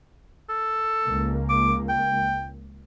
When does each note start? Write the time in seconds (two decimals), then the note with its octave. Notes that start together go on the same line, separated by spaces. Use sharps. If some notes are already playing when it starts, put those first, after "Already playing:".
0.49 A4
1.06 C#2 A#3
1.49 D6
1.89 G5